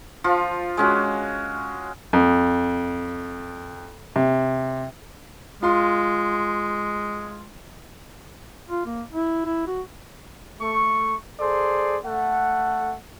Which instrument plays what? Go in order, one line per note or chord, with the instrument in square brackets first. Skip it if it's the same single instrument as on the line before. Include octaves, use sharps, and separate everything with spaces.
[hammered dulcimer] F3 F4
G#3 C#4 F#4
[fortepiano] F2
C3
[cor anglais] G#3 [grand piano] F4 C6
[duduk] F4
A#3
E4
E4
F#4
[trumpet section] A3 C#6
G#4 A4 C5 D5 C6
A3 A4 F#5